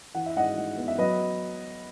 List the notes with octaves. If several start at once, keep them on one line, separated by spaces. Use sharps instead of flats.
E3 F#5
E5
G#2 D#5 F#5
G#2
B3
E5
F#3 B4 D#5